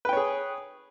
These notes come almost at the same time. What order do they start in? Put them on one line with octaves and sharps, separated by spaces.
B4 G5 C#5 G#4